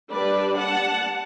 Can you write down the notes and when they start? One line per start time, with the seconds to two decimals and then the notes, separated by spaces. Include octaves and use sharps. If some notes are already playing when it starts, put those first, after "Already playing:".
0.12 G3 D4 B4 D5
0.58 F#5 A5